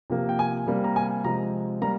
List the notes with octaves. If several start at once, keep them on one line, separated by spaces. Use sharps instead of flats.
C3 F3 A#3
G5
G#5
C3 G3 A#3
A#5
G#5
C3 F3 G#3 A#5
G3 A#3 A#5